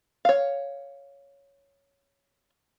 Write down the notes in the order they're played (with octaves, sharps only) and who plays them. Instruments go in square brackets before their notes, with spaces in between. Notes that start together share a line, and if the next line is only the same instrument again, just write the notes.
[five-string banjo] C#5 F5